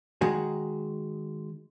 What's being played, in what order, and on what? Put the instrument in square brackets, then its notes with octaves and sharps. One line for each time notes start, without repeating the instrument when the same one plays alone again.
[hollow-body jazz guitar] D#3 G#3 F#4 G#4